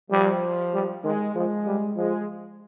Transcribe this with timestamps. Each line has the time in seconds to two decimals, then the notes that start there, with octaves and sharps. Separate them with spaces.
0.10 F3 G3
0.73 G3
1.04 D#3 G#3
1.35 F3 G#3
1.66 G3
1.96 F3 G#3